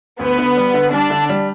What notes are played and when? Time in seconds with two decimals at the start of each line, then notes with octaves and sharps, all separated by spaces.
0.19 D2 B3
0.38 D3
0.57 G3
0.74 D3
0.92 G3 D4
1.10 D3
1.29 G3